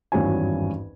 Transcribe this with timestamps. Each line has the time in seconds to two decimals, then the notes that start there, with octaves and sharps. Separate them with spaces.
0.12 G#1 E2 G2 C#4 F#4 G#5